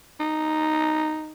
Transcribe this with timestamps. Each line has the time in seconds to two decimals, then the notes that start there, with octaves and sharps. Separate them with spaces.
0.20 D#4